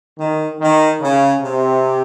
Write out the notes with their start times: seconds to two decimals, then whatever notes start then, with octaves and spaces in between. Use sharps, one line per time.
0.19 D#3
0.60 D#3
1.01 C#3
1.41 C3